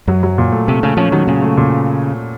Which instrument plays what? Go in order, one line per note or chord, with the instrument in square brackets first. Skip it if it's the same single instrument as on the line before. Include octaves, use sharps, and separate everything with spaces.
[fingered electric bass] F#2 [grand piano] F#3
[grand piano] F#3
A#2
A3
[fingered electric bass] C3 [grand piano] A3
[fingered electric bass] C#3 [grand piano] A3
[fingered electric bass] F3 [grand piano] C#4
[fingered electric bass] D#3 [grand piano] F#3
[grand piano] A#2 [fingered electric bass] C#3
[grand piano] A3
A#2